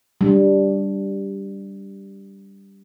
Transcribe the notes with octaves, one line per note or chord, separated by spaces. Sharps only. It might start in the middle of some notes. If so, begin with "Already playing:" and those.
G3 D4